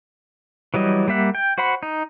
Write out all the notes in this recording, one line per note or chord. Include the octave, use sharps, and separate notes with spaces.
E3 F#3 G3 D#5
G3 A#3 E5 F#5
G5
F#4 C5 F#5 B5
D#4